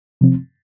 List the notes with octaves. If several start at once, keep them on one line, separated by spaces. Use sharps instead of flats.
C3 F3 C4